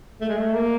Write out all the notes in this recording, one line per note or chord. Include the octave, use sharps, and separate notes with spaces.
A3
G#3
A3
A#3